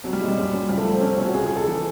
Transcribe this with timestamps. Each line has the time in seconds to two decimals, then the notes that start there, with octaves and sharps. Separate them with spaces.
0.04 C2 F#3
0.13 G3
0.21 A#2 G#3
0.28 G3
0.37 F#2
0.53 F#2
0.69 C#2 G3
0.78 A3
0.85 F3
0.94 C4
1.01 C2 C#4
1.10 C4
1.18 B2 C#4
1.27 F#4
1.34 C#2 G#4
1.45 G#4
1.51 C#2 A4
1.67 E3 A4